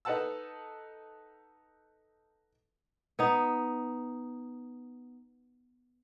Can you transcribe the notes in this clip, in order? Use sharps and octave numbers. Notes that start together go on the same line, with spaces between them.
D#4 A4 B4 F#5 A5 E6
B3 D#4